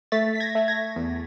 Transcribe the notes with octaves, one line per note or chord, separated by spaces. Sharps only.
A3 A6 B6
B6
G#6 A#6
A3
G#6 A#6
E2